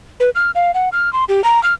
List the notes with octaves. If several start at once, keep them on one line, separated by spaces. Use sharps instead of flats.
B4
F6
F5
F#5
F6
C6
G4
A#5
F6